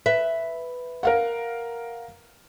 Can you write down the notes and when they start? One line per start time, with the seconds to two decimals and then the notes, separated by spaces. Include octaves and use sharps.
0.06 B4 E5
1.03 A#4 F5 F#5